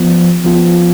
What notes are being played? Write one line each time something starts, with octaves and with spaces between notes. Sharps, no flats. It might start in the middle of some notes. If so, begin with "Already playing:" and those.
Already playing: F3 B3 F4
F3 B3 F4